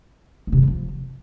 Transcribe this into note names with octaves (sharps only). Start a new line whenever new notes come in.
A#3
C3
G2
D3
F3